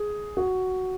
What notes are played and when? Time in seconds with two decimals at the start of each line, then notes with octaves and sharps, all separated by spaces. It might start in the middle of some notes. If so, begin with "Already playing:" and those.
Already playing: G#4
0.37 F#4